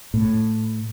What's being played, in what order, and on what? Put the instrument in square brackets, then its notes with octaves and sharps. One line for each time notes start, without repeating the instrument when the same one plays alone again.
[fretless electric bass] A2